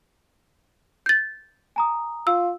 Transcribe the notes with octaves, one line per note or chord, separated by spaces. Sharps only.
G6 A6
G#5 A#5 D#6
F4 E6